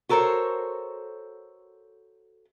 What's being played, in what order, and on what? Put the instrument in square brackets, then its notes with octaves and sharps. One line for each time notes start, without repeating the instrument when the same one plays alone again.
[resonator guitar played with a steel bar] F#4 A4 A#4 C5 C#5